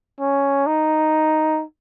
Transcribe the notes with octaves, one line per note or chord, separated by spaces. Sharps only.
C#4
D#4